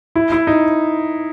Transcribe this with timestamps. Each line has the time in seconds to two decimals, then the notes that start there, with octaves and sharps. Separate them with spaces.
0.16 E4
0.32 E4
0.47 D#4